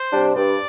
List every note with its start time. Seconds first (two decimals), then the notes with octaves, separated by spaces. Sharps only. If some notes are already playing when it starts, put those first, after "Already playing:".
Already playing: C5
0.12 C3 G3 D4
0.36 G2 D5